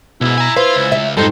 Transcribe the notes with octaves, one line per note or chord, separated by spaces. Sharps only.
B1 G#2 B2 E4
G#5 A#5
B4 C5 F5 C6
C#2
E5
F2 G#2 B2 G3 D#4 A4 C5